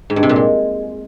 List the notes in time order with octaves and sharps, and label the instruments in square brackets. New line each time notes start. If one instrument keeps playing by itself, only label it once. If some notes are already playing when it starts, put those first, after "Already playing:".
[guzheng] G#2
G2
C3
A#2
G#3